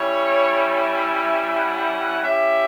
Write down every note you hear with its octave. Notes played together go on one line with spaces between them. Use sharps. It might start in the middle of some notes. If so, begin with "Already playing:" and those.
Already playing: G3 C#4 E4 C#5
E5
F#5
C#4 E4 G4 E5